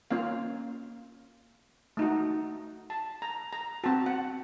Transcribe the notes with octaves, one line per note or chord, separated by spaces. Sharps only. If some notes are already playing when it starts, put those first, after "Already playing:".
A#3 C#4 F4 F5
A3 D#4 F#4
A5
A#5
A#5
C4 F#4 A5
F#5